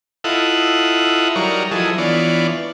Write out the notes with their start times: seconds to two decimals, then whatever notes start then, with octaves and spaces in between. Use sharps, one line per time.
0.24 E4 F4 A4 D#5 F#5
1.36 F#3 G3 D#4 A#4 C#5 D5
1.71 F3 F#3 E4 G#4 A4 D#5
1.98 E3 B3 D4 F4 C#5 D5